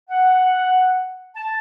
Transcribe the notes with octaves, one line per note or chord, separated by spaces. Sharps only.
F#5
A5